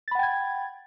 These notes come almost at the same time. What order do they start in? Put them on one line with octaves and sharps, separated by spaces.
A6 B5 F#5 G5 G#6